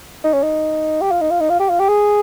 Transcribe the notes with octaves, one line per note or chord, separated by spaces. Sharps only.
D#4
C#4
D#4
G4
F4
D#4
F4
D#4
F4
G4
F4
G4
G#4